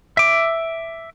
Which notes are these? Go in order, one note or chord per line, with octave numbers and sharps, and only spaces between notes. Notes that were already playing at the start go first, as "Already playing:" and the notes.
E5 D6